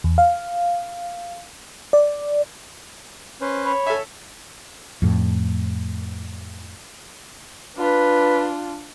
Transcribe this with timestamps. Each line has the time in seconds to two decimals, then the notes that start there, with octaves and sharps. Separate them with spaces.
0.04 E2
0.18 F5
1.93 D5
3.41 C#4 B4 C5
3.65 C#5 B5
3.86 A4 E5 G#5
5.02 F2 A2
7.76 D4 F4 B4